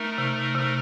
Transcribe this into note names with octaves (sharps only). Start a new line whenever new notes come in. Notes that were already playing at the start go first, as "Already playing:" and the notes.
Already playing: A3 D#4 A#4
C3
C3